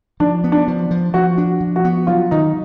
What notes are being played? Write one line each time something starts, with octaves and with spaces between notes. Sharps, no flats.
F3 D4
B3
D4
F3
F3
F3 F#4
D4
F3
F#4
B3
F#3 F4
D#3 D#4